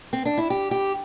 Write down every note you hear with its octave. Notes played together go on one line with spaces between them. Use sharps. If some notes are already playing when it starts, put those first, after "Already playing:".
C4
D4
E4
G4
G4